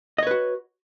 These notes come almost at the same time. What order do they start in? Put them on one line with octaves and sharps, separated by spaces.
D#5 C#5 B4 F#4